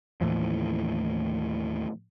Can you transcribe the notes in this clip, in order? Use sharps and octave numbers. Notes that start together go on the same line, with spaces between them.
D#2 A2 E3 F3